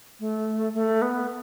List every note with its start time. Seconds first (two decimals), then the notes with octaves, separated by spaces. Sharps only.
0.20 A3
0.74 A3
1.02 B3